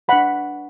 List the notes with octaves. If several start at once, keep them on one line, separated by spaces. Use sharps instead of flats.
D4 B4 F#5 B5